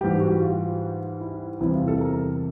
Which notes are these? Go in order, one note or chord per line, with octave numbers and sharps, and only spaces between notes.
G#2 E3 G3 G4
F#4
F4
E4
E2 C3 E3 G3 E4
F4
A4
A#4